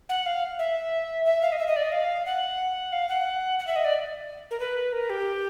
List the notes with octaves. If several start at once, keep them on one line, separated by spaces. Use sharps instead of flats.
F#5
F5
E5
E5
F5
D#5
E5
D#5
D5
D#5
F5
F#5
F5
F#5
F#5
E5
D#5
D5
A#4
B4
A#4
G4